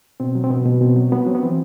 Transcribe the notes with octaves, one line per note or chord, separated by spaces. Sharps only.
B2 C4
F#3
C4
B2 B3
B2
B2 C4
F#3
F#3 B3
F#3 C4
B3
E3 C4